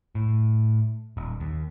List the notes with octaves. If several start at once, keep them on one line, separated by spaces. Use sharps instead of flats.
A2
D#1
D#2